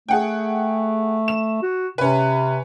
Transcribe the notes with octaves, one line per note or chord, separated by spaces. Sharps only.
A3 G#4 F#5 G5
E7
F#4
C3 C#4 B4